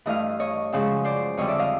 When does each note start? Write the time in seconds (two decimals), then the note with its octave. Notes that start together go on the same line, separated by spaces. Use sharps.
0.06 G2 E3 A3 D#5 F5
0.40 C#5 D#5
0.72 F#2 C#3 F3 G#3
1.05 C5 D5
1.37 F2 D3 G3 C#5 D#5
1.48 D5 E5
1.59 D#5 F5